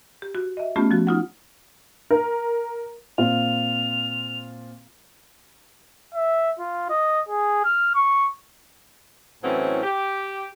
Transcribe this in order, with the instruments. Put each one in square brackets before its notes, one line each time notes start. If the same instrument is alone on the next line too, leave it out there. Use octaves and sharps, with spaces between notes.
[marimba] G4
F#4
D#5 E5
A3 B3 C#4 F4 G4
F3 F#4
D#4 F4 F#5
[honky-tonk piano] A#4
[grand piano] A#2 C4 F4 [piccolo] F7
[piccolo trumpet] E5
F4
D#5
G#4
F6
C#6
[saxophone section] A2 E3 F#3 C4 C#4
G4